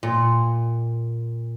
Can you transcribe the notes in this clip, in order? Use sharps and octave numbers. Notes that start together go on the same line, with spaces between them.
A#2